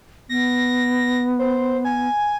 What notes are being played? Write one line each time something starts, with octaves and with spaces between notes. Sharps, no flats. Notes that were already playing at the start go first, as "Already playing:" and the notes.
B3 A#6
C5
G#5